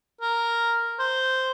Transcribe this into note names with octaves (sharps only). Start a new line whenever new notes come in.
A#4
C5